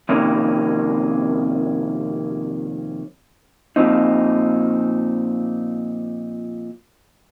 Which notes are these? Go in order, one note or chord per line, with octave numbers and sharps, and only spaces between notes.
F2 C3 D#3 A#3 C#4
A#2 F3 C4 D#4